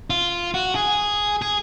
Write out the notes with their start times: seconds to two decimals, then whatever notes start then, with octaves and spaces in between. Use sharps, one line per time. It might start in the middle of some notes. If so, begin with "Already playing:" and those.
0.10 F4
0.54 F#4
0.75 G#4
1.42 G#4